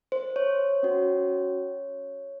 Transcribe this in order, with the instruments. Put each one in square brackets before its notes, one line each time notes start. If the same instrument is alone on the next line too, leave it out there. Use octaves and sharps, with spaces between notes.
[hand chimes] C5
C#5
C#4 F#4